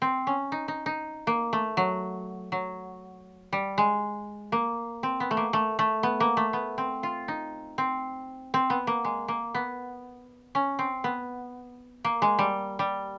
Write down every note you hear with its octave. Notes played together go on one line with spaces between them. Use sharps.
C4
C#4
D#4
D#4
D#4
A#3
A3
F#3
F#3
G3
G#3
A#3
C4
B3
A3
A#3
A3
A3
B3
A#3
A3
B3
C4
F4
D#4
C4
C4
B3
A#3
G#3
A#3
B3
C#4
C4
B3
A#3
G#3
G3
G3